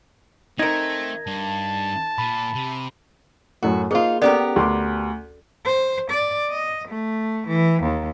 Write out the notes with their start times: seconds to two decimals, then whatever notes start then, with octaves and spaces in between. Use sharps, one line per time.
0.59 A3 C4 D#4 A#4 G#6
1.27 G2 A5
2.18 A#2 B5
2.55 C3
3.63 F#2 A2 F#4
3.91 A#3 D#4 F4 G#4 C5
4.22 B3 C#4 G4 A4 A#4 D5
4.56 D2 C6 D6
5.65 C5
6.10 D5
6.51 D#5
6.88 A3
7.47 E3
7.83 D#2